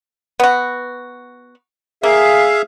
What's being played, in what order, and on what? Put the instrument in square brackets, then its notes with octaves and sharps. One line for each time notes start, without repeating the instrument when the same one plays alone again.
[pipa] B3 F#4
[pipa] A#3 [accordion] G#4 E5 F5